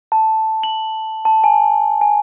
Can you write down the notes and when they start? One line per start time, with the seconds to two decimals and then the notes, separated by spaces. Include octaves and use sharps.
0.12 A5
0.63 F#7
1.25 A5
1.44 G#5
2.01 G#5